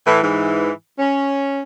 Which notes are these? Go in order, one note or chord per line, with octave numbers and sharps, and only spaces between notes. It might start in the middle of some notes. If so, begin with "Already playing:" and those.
A2 E3
G#2 E3
C#4